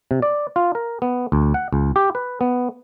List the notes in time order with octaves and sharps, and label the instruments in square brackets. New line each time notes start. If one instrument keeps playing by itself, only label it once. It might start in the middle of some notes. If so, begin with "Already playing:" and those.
[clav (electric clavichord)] C3
D5
F4
A#4
B3
D2
F#5
C#2
G4
B4
B3